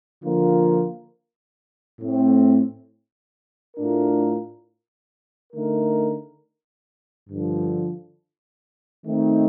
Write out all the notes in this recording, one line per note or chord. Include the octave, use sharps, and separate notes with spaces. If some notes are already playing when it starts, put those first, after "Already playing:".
D3 F3 A#3 F4 A#4
A2 A3 C4
A2 A3 D4 F4 A#4
D3 A3 D#4 A#4
G2 D3 F3
D#3 A3 C4 D#4